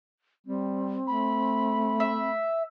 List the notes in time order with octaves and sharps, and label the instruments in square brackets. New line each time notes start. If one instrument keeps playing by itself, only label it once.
[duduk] G3 [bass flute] C4
[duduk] A3 [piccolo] B5
[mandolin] E5